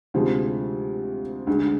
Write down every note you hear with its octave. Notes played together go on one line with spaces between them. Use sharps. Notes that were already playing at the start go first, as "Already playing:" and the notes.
D2 C3 F3 G#3
D2 D3 G#3